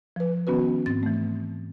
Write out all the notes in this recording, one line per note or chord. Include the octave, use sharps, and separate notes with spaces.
F3 B4
D#3 B3 C#4 F#4 B4
G#2 C4 A6
E3 A3